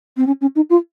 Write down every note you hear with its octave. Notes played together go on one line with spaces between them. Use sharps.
C4
C#4
C#4
D#4
F4